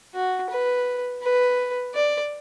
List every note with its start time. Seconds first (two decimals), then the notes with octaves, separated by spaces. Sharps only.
0.14 F#4
0.50 B4
1.22 B4
1.94 D5